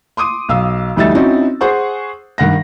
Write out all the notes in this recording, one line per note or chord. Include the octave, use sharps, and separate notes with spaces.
C6 D6 D#6 D#7
B1 F5 E6
D2 E3 G3 D#4 E5 A6
C4 C#4 D#4 E4 F#4
G#4 C5 F#5 C#6
G2 D#3 F#5 A#6